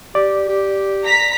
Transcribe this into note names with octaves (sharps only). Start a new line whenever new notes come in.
G4 D5
G4
A#5 B6